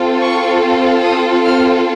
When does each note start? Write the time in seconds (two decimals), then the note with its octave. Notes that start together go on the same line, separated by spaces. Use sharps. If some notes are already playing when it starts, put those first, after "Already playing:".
Already playing: C4 F4 A4
0.20 C#6
1.03 D#6
1.45 F6